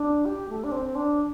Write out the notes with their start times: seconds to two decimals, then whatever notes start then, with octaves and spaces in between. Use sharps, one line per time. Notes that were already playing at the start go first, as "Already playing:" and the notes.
Already playing: D4
0.25 G4
0.49 A3
0.64 D4
0.72 C4
0.95 D4